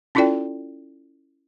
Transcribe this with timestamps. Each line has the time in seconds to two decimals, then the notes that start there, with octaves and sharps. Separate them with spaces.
0.15 C#4 E4 F4 A4 D5 G5